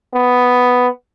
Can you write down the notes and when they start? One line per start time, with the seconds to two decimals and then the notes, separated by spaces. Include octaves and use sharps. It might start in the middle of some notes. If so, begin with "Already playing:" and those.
0.14 B3